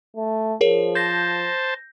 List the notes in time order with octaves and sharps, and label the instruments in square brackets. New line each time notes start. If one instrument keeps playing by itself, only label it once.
[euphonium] A3
[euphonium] F3 [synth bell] G#4 A#4 C#5
[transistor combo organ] C5 A5 [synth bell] G6 A#6